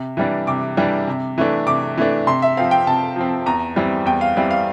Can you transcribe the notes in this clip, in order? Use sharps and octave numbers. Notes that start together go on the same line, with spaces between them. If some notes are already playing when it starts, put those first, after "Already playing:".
Already playing: C3
E3 G3 D4
C3 D6
E3 G3 D4
C3
E3 A3 D4
C3 D6
E3 A3 D4
C3 C6
E5
F3 C4 F5
G5
C3 A5
F3 C4
E2 A#5
E3 G3 C4
E2 G5
F5
E3 G3 C4
F5